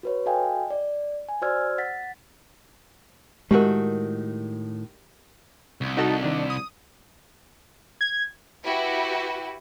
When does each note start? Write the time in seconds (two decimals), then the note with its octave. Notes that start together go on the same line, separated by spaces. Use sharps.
0.03 F#4 B4 C#5
0.26 F#4 A4 D#5 F5 G5 G#5
0.70 D5
1.29 G#5
1.42 F#4 C5 D5 E6 F6 G#6
1.78 F#5 A6 B6
3.51 A2 D#3 G#3 F#4 G4 A#4
5.81 C2
5.97 D#4 F#4 A4
6.23 D#3 D4
6.50 D#6
8.01 G#6
8.64 E4 F#4 G4 B4